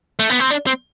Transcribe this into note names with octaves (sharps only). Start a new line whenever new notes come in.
A3
B3
C4
D4
C4